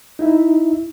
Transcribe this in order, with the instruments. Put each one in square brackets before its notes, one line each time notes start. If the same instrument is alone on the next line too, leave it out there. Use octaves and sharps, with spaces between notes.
[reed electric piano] D#4 E4 E5